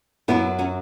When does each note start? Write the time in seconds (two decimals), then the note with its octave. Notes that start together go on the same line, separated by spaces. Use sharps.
0.28 F#2 F#3 B3 E4
0.59 C#4 F#4